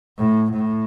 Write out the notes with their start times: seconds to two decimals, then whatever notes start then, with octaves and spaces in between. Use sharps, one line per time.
0.18 A2
0.53 A2